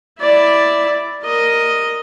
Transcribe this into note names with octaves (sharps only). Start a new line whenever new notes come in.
E4 D5
A#4 D#5